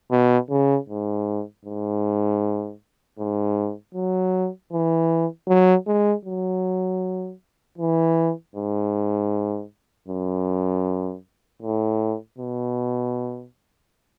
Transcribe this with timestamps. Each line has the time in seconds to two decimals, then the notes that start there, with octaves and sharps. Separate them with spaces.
0.11 B2
0.50 C#3
0.89 G#2
1.65 G#2
3.19 G#2
3.94 F#3
4.72 E3
5.48 F#3
5.87 G#3
6.25 F#3
7.78 E3
8.56 G#2
10.08 F#2
11.62 A2
12.38 B2